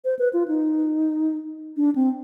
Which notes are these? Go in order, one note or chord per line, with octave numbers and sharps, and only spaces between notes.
C5
B4
F4
D#4
D4
C4